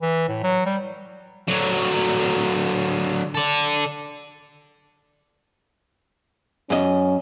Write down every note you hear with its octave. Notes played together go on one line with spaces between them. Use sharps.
E3
A2
F#3
G3
D3 F#3
A4 D5
F#2 C#4 D#5